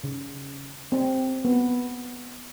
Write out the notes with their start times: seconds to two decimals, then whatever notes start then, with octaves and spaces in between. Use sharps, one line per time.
0.04 C#3
0.92 C4
1.45 B3